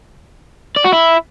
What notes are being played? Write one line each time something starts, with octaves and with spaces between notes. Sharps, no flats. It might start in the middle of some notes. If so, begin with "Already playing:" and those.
D5
F#4
E4